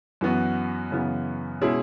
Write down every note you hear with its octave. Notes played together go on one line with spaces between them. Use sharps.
F#2 E3 B3 F#4
F#2 C#3 E3 B3
B2 G#3 C#4 E4 G#4